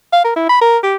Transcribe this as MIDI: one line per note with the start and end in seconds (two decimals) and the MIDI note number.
0.13 0.22 77
0.24 0.33 70
0.36 0.45 64
0.49 0.60 83
0.61 0.78 70
0.83 0.96 67